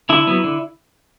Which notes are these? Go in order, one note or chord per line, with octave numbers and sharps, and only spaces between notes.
D3 E4
F#3 B3
D3